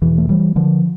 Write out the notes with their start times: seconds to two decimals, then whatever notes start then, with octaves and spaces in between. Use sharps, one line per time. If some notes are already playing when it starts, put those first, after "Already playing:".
0.01 E2 B2 E3
0.18 A3
0.29 E3 G3
0.56 D3 F3